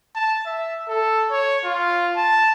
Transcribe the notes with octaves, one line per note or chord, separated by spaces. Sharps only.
A5
E5
A4
C#5
F4
A5